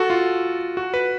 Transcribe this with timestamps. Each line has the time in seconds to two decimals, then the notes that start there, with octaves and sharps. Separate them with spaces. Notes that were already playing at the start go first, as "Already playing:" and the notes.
Already playing: F#4 A4
0.10 F4
0.77 F#4
0.94 B4